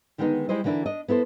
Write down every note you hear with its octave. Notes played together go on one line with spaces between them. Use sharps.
D3 D#3 G#3 B3 C#4 D#4
G3 G#3 E4 C5 D#5
D3 E3 A#3 D4 E4
D4 D#5
B3 E4 A4 C5